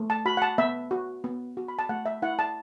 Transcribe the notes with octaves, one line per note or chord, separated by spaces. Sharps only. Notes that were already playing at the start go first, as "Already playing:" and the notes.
Already playing: A3
A5
F#4 B5
F#5
A5
B3 E5
F#4
B3
F#4
B5
A5
A3 F#5
E5
E4 F#5
A5